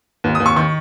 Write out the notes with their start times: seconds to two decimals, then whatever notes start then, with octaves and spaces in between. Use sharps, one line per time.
0.24 D#2
0.35 D#6
0.40 D#2
0.46 C#6
0.56 D#3 C#6